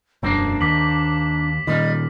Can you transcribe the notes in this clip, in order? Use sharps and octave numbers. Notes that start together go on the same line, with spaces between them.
E1 F#2 A#3 C4 D4
D#2 D6 B6 F#7
A#2 D#3 G3 D#5